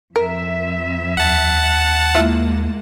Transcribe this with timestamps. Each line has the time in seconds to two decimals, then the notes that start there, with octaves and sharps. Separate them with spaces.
0.16 F2 A#4 E5
1.17 D#2 F#5 A5
2.15 G#3 A#3 E4 F4 E5